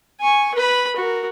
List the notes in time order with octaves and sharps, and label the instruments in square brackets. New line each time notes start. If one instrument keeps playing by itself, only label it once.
[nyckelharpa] G#5 C#6
B4 B5
F#4 A#4